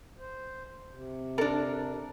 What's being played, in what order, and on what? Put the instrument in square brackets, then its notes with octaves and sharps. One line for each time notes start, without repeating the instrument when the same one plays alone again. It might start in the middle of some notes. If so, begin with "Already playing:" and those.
[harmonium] C5
C3
[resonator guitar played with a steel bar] D4 A#4 [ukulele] A4